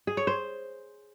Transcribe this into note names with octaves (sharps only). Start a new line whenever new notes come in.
G#4
C#5
C5